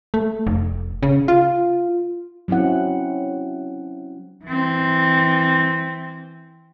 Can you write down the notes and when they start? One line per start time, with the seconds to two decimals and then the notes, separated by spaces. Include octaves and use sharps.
0.14 A3
0.47 F1
1.03 C#3
1.28 F4
2.48 F#3 C4 C#4 E4 F#5
4.46 E3 C4